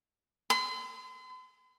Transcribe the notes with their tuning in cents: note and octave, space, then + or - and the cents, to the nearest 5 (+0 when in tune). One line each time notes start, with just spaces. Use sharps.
C6 -45